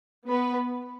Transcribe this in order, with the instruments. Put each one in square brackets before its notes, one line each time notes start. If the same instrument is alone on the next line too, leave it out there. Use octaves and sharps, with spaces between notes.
[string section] B3 B4